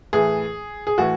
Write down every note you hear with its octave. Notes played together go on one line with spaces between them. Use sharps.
A2 E3 G#4
G#4
A2 E3 F#4